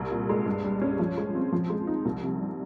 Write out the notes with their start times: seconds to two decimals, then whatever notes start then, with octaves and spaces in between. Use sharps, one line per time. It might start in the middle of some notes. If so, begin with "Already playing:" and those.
Already playing: C2
0.11 A#2
0.29 G#3
0.46 G2
0.64 G3
0.82 C#4
0.99 F3
1.17 G#3
1.35 C4
1.52 F3
1.70 G#3
1.87 D#4
2.05 C2
2.23 C3
2.41 G3